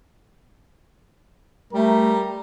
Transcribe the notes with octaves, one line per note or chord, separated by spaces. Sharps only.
G3 A3 A#4 A#5